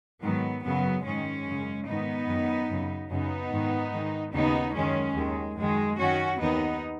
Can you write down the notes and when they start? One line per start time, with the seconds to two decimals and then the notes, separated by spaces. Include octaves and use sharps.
0.22 G#2 D#3 F#3 B3
0.63 F#2 C#3 F#3 B3
1.04 G#2 D#3 G#3 C#4
1.45 F#2 C#3
1.86 G#2 D#3 B3 D#4
2.27 F#2 D#3
2.70 F#2 C#3
3.10 F#2 C#3 B3 D#4
3.51 G#2 D#3
3.92 G#2 D#3
4.33 D#2 C#3 B3 D#4
4.74 F#2 D#3 G#3 C#4
5.15 D#2 D#3 G#3
5.56 F#2 D#3 G#3
5.98 F#2 D#3 C#4 F#4
6.39 D#2 D#3 B3 D#4